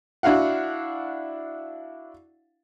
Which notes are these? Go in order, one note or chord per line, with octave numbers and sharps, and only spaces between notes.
D4 E4 F#4 F5 F#5